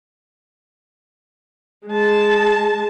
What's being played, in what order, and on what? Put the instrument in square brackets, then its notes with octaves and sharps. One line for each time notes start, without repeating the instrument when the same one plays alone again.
[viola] G#3 A5